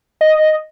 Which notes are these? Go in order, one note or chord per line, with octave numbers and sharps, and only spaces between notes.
D#5